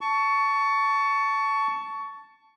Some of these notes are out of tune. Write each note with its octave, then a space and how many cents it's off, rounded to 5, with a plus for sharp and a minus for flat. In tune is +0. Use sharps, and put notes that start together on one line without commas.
A5 +0 C#6 +20